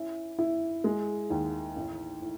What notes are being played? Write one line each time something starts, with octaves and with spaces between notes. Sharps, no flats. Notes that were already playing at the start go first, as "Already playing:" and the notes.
Already playing: C#4 E4
E4
G#3
D#2
A1
A2